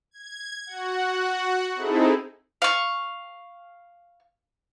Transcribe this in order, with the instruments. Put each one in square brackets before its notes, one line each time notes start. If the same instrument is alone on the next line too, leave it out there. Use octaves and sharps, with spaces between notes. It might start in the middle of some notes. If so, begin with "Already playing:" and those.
[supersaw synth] G#6
F#4 F#5
C4 D#4 E4 G#4 A4
[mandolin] F5 C#6